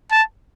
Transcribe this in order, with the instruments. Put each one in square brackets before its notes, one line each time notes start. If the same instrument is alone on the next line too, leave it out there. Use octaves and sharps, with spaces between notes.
[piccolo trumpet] A5